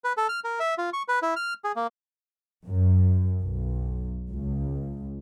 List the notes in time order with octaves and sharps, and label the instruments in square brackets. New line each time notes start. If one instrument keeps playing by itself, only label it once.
[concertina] B4
A4
F6
A#4
E5
F4
C#6
B4
E4
F6
G#4
A#3
[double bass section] F#2
B1
C#2